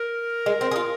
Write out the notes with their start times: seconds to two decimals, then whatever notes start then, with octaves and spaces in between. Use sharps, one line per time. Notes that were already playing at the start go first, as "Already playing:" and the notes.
Already playing: A#4
0.46 G#3
0.61 C4
0.71 G#4
0.76 F4